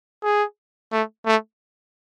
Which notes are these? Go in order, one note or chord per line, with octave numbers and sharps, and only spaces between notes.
G#4
A3
A3